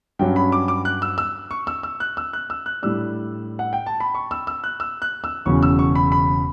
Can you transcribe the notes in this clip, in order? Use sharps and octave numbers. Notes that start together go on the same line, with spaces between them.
G2 F#3 C#4 G5
B5
D6
D6
F#6
E6
E6
C#6
E6
E6
F#6
E6
F#6
E6
F#6
A2 G3 D4 E6
F#5
G5
A5
B5
C#6
E6
E6
F#6
E6
F#6
E6
E1 E2 C#3 F#3 C#4 C#6
E6
C#6
B5
B5